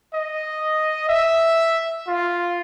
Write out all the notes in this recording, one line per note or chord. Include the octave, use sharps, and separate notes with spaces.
D#5
E5
F4